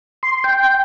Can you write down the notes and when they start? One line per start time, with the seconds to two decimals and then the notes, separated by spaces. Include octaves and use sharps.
0.23 C6
0.44 G5